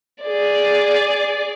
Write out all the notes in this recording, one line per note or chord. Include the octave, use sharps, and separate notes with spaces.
G#4 D5